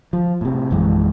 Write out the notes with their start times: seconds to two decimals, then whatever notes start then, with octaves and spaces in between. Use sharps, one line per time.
0.13 F3
0.41 A2 C3
0.71 A#1 F#2 E3 G#3